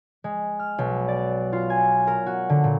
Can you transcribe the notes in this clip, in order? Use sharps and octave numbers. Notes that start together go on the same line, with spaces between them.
G#3
F6
B1
D5
F4
G#5
A#4
F#4
D3
A#2